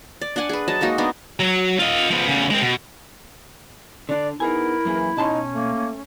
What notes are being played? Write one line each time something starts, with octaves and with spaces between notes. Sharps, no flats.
D5
D4 D5 F#5 G#5
G#4 B4
F#3 D#5 A5
G#3 A#3 D#4 F#4
B3 D4 D#4 D5
F#3
F4 D#5
F3 B3
E2 C#3
G#3 C4
B2
D3 D4 D5
B3 D#4 E4 G#4 A#4 G#5
F#2 E3 A#3 G#4
B2 C#4 D#4 A5 C6
A3 A#3